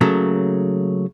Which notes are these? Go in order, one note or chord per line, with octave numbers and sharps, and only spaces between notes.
C#3 F#3 A3 A#3